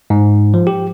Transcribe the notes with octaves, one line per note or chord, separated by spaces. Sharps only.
G#2
F3
G4